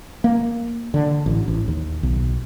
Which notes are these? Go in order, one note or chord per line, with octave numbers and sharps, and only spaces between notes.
A#3
D3
A1
A1
D#2
B1